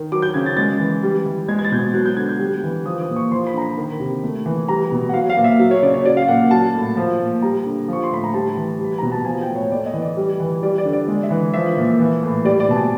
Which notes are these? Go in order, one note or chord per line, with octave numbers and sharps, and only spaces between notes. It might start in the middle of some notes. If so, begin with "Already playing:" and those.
Already playing: D#3
F#3 D6
G6
C#3 G#6
A6
G#3 A6
E3
G3
E3
G#3 G#6
G#6
A6
B2 G6
G#6
F#3 F#6
G6
D3 G#6
G6
G3
E3
F3 D#6
D#6
A#2
C#6
F3 C6
B5
D3 A#5
B5
D#3
C3
A3
E3
G3 A#5
B2
F#5
F#3 F5
F5
A#2
E5
F#3
C#5
C#3 D5
C#5
F#3 D5
F5
A#2 F#5
F#3 A5
A2
F3
A#2
G3 A#5
D3
F3 C#6
C6
A2 B5
A#5
G3 A5
E3
G3
B5
B2 A#5
A5
F3 G#5
G5
A2
C#5
A3 D5
D#5
E3
D5
G3
E3
G3 D5
D5
D3
D5
G#3
E5
E3
F3 E5
A#2
E3
A2
G3 D5
D5
B2 A5
G#5